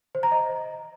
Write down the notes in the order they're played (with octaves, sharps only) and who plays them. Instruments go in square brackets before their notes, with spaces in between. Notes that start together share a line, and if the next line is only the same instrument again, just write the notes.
[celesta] C5
A#5
D#5